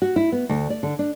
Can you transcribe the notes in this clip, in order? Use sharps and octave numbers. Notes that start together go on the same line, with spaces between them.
F#4
E4
B3
D2
D5
D3
D4